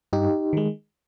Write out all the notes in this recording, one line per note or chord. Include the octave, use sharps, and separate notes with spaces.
G2 D#4 G4
D#3 G#3